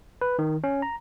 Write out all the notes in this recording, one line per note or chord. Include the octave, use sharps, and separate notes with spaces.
B4
D#3
C#4
A#5